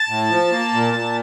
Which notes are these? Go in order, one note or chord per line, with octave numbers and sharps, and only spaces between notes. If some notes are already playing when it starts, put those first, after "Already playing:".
Already playing: A5
A2
F3
A#3
A#2
A#2